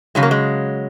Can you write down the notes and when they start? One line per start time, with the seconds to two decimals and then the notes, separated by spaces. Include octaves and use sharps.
0.15 C#3 F#3 G#3
0.23 A#3
0.31 G#3